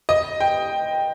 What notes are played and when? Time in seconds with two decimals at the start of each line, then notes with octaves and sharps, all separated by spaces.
0.09 D#5
0.40 G5